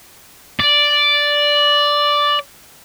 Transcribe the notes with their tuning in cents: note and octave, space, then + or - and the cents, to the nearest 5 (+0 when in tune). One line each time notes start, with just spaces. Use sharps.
D5 -5